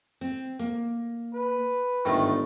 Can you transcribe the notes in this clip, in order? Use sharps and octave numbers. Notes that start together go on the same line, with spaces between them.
C4
A#3
B4
G1 G#2 D#3 A3